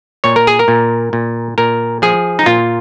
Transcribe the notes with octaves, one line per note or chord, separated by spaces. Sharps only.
A#2 C#5
A#4
G#4
A#4
A#2
A#2
A#2 A#4
F3 G#4
D#4
A#2 F4